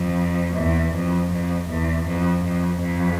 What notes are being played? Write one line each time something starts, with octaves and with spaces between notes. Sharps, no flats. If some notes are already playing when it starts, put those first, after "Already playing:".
Already playing: F2
E2
F2
F2
E2
F2
F2
F2